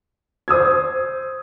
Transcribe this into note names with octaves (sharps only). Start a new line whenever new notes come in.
C5 D#6 E6 G#6